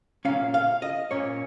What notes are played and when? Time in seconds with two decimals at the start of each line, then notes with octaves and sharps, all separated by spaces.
0.25 A#2 A#3 C#4 F5
0.54 F5
0.82 D#5
1.11 A#2 A#3 C#4 C#5